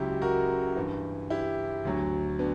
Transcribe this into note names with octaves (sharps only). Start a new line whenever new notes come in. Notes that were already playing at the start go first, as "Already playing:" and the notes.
Already playing: C#2 C#3 F#3 E4 G4
F#4 A#4
G2 E3
E4 G4
D2 D3 F#3
B3 D4